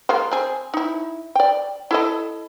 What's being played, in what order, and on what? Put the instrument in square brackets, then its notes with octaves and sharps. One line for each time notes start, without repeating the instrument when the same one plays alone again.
[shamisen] G#3 A#3 F4
C4 G#4
D#4 E4
D5 G5
E4 A4 D#5